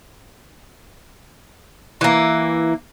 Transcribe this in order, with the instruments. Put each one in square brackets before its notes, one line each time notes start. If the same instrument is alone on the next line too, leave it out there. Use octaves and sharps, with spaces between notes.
[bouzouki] E3 A#3